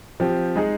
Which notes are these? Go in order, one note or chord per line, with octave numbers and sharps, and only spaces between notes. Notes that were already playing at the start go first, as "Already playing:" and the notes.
F3 C4 G4
G#3 D#4 G#4